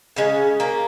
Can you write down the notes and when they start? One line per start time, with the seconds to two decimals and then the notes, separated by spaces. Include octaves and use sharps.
0.16 C#3 G#3 C#4
0.60 A#3